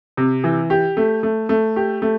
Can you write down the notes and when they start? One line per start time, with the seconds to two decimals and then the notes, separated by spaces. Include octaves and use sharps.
0.17 C3
0.44 E3
0.70 G4
0.97 A3
1.23 A3
1.49 A3
1.76 G4
2.02 A3